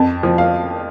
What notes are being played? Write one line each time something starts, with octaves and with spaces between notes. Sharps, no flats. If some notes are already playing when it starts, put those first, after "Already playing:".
Already playing: F2 A5
F3
F5